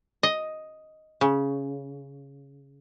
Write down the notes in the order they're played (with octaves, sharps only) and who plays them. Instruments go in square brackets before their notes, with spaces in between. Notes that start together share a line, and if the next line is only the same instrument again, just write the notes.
[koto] D#5
C#3